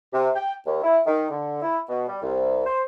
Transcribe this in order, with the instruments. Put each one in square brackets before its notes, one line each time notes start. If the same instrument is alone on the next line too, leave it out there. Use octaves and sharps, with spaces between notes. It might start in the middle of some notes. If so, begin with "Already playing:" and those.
[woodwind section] C3
G5
D#2
E4
D#3
D3
E4
B2
G3
C2
C5